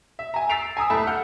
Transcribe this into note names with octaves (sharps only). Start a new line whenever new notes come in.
E5
G#5 A#5
E6 A6 B6 C7 D7 F7
G#5 A#5 D#6 E6
D#1 A3 E4 A5 B5
F#5 F6 G6 C#7